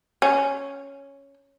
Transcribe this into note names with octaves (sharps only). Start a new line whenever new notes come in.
C#4